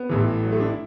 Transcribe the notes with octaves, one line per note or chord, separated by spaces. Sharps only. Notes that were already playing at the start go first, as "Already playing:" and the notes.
Already playing: B3
A1 A2 E3
F#3
A3
D4
E4